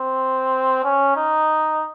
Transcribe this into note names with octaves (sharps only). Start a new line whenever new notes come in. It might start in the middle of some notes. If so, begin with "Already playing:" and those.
Already playing: C4
C#4
D#4